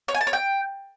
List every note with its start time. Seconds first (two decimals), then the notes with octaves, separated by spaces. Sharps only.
0.08 C#5
0.14 G#5
0.21 A5
0.27 C#5
0.33 G5